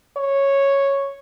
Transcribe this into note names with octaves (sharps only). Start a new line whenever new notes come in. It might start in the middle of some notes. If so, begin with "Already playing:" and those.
C#5